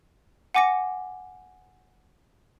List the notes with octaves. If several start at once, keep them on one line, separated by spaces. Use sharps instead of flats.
F#5 G#5 D6 A#6 C#7